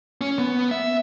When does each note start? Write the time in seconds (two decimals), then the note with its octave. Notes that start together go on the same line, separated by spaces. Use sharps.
0.21 C#4
0.39 B3
0.71 E5